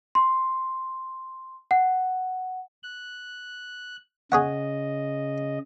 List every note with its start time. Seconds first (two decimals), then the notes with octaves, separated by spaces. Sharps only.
0.15 C6
1.71 F#5
2.83 F#6
4.32 C#3 G#4 C#5 D#5 F#5